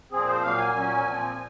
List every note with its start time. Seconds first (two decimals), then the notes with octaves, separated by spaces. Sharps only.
0.12 A#2 F3 C4 G#4
0.27 C5
0.42 A#2 F#3 A#3 F5
0.58 G#5
0.74 A#2 F#3 C#4
1.04 A#2 F3 C4